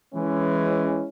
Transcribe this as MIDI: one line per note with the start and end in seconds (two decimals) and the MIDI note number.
0.14 1.09 52
0.14 1.09 56
0.14 1.09 61